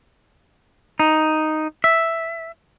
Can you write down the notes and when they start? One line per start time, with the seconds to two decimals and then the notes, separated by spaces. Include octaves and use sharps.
0.99 D#4
1.84 E5